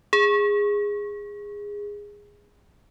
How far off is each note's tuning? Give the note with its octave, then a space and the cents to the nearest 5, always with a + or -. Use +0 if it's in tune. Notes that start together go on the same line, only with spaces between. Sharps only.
G#4 -15